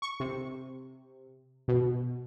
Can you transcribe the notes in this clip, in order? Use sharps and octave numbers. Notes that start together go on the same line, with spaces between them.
C#6
C3
B2